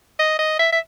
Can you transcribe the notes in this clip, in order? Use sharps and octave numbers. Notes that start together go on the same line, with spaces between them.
D#5
D#5
E5
E5